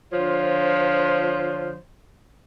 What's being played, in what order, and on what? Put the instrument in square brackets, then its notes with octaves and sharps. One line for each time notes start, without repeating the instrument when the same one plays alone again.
[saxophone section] D3 F3 F4 C5 C#5